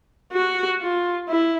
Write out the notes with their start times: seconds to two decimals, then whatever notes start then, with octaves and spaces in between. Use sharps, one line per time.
0.33 F#4
0.81 F4
1.29 E4